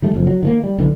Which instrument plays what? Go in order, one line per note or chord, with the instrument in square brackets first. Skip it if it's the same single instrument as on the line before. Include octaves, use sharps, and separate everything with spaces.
[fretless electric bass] D#3 G3 A3
F#1 F2
F#3
D#3 E3 A#3
G3
B1 D3 E3